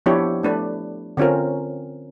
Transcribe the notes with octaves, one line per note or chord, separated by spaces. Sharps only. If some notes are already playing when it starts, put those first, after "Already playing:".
F3 B3 D4 E4 G4 C#5
A3 D4 B4
D3 C4 C#4 F4 A#4